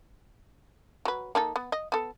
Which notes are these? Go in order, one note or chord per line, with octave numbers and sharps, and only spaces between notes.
F#3 B4
A#3 D#4 A4
B3
D#5
B3 A4